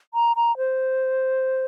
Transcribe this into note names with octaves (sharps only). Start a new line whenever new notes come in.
A#5
A#5
C5